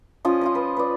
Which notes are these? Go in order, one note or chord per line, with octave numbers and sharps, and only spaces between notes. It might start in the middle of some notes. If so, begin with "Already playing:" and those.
F3 C#4 F4 D#5
F4 C5 D#5
B4
B4 D5